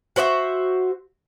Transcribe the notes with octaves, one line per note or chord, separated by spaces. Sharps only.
F#4 C5 D5 E5